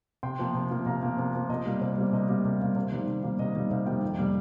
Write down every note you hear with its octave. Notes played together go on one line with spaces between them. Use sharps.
C3 G5 C6
F3 A#3
C3
F3 A#3
C3 F5 A#5
F3 A#3
C3
F3 A#3
C3 D#5
G3 A#3
C3 C5
G3 A#3
C3 D#5
G3 A#3
C3
G3 A#3
C3 C5
D#3 G3 A#3
C3
D#3 G3 A#3
C3 D#5
D#3 G3 A#3 D#5
C3 C5 F5
D#3 G3 A#3 D#5 G5
F2
C3 G3 A#3